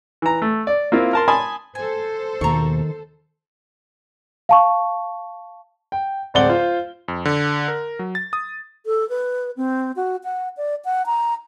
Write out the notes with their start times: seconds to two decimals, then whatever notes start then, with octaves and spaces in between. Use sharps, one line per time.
0.22 E3 A#5
0.42 A3
0.67 D5
0.92 A#3 C4 E4 F4
1.13 A#4 A5 C6
1.28 G#5 A5 B5 C6 D#6
1.75 A4 C5 G#5
2.41 D#2 B2 D#3 A#3 A#5 C#6
4.49 F5 A5 C#6
5.92 G5
6.34 D1 G#3 C4 D5 F#5 G7
6.49 F4 C5
7.08 F2
7.25 D3
7.68 A#4
7.99 F#3
8.15 A6
8.33 D#6
8.86 A4
9.09 B4
9.57 C4
9.96 F#4
10.24 F#5
10.57 D5
10.85 F#5
11.06 A#5